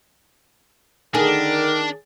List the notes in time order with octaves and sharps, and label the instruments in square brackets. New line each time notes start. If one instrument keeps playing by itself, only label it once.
[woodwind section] D3 A#4 [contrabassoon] D#3 [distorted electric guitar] D4 [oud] G#4